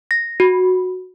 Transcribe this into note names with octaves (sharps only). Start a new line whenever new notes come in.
A#6
F#4